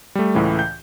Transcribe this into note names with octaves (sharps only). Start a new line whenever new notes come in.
G3 A3
C#2 A2 C#3 E3
G6